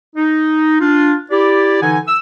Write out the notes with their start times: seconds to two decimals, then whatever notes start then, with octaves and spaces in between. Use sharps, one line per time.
0.16 D#4
0.80 D4 F4
1.30 E4 G4 D5
1.82 D3 E3 D#4 F#5 G#5
2.07 E6